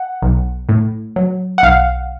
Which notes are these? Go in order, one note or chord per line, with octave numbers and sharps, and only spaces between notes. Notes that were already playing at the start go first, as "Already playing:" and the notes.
Already playing: F#5
B1
A2
F#3
F#5
B1 F5